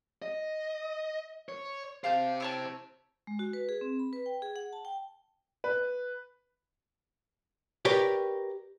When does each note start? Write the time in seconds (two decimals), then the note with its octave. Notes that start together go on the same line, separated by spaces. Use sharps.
0.22 D#5
1.49 C#5
2.04 G4 C5 F5 A5 G6
2.40 E4 C#5 A5
3.27 G#3
3.39 F#4
3.53 B4
3.69 G#4
3.81 C4
3.99 B5
4.13 B4
4.26 G5
4.42 G#4
4.56 F#5
4.73 A5
4.85 G5
5.64 B4
7.85 G4 A#4 B4 C#5 D5